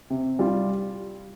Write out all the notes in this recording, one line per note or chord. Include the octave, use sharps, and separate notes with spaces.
C3
G3 F4